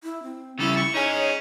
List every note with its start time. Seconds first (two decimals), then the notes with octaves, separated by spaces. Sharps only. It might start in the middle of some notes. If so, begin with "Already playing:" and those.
0.03 E4
0.23 C4
0.59 C#3 G3 E4 A4
0.77 C#6
0.94 C#4 D#4 G#4 C#5